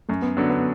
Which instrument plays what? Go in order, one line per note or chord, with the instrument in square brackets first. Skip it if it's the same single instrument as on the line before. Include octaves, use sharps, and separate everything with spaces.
[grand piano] F#2 [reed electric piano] A3
[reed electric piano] B3
[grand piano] D3 F#3 [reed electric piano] B3
[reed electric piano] B3